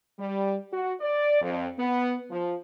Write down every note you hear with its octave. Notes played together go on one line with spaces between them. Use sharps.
G3
F#4
D5
F2
B3
F3